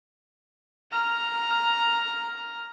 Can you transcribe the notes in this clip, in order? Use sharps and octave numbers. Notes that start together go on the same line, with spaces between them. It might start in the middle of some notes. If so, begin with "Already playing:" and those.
A#5 F6